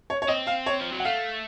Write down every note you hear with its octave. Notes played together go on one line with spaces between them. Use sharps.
C#5
C#5
C4 D#5
F5
C#5
F3
F#3
F#5
A3 F5